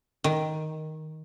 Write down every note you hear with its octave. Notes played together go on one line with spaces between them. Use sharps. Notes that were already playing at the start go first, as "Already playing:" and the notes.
D#3